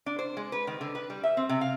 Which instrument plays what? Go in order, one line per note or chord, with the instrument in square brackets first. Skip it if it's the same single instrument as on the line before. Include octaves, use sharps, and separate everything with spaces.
[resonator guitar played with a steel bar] D4
C5
G#3
B4
D#3
D3
B4
G3
E5
C4
C3
F5